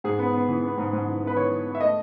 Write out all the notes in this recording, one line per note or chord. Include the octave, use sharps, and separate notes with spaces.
G#2 G#4
B3
B3
E3
B3
G#2
G#2
E3
B3 B4
E3 C#5
E3
B3
E5
A3 D#5